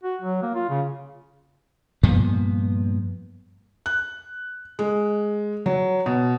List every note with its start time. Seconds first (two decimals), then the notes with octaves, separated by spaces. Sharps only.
0.04 F#4
0.22 F#3
0.43 A#3
0.55 F4
0.70 C#3
2.03 G2 A#2 F3 B3
3.86 F#6
4.79 G#3
5.66 F#3
6.06 B2